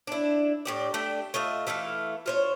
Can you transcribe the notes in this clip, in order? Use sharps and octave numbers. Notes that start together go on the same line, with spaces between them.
D4 E4
A2 G4 D5
A3 D4 G4
A3 F4 D#5 E5
E3 A3 E4 F5
F4 C5 C#5